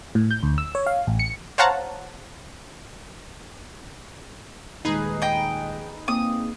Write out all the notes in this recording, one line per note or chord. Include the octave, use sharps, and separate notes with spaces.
A2
G6
D2
E6
C#5
F5
A1
C#7
C5 C#5 F5 F#5 A5 A#5
D#1 G#3 D#4 G#4 B4 C7
D#5 G5
A#3 C4 D#6